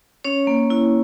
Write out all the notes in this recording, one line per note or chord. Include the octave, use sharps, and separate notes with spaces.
C#4 C#5
A#3
E4